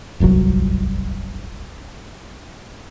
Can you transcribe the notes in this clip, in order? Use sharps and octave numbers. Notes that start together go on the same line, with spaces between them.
D1 G1 C2 F#3